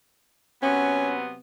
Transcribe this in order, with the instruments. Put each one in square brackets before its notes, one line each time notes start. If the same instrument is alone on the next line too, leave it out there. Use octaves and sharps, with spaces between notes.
[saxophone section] C3 F#3 B3 [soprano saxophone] C#4